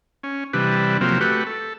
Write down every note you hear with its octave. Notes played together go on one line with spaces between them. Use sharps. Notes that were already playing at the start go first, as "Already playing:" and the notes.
C#4
C3 E3 G3 D4 B4
C3 F3 F#3 A#3 C4
A3 F#4 G4 B4
A4